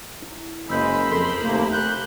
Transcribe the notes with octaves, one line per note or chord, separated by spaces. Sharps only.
E4
F#1 G#3 A#4 C5 B5 E6 G6
F2 A4 C6
D#2 C3 A3 A#3
F#6 G6